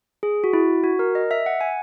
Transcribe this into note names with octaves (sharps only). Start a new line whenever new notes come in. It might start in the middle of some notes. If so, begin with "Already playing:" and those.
G#4
F#4
E4
F#4
A#4
D#5
E5
F#5
G#5